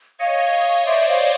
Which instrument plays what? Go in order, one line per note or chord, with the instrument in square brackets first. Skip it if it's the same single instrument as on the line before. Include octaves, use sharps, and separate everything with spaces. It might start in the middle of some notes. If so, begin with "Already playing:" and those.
[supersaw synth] C#5 D#5 [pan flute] F5
[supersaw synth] C5 D5 [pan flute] E5
[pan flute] F5